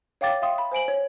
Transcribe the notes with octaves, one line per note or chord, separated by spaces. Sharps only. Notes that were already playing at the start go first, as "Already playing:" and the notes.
C#5 F5 G5 D6 A6
E5 F5 G5 C6 D#6
B5
C5 G#5 D7 F#7
C#5